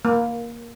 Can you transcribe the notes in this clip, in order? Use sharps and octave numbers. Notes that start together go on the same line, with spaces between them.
A#3